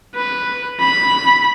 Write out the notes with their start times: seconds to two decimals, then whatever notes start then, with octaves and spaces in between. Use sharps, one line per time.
0.16 B4
0.80 B5